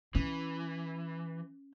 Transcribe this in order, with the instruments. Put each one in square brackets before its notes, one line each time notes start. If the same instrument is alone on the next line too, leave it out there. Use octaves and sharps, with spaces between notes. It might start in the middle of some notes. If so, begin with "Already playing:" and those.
[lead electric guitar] E3 [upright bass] C#4